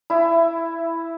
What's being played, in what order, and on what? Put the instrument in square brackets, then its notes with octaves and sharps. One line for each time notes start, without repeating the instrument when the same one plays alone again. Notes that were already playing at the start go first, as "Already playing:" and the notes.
[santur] E4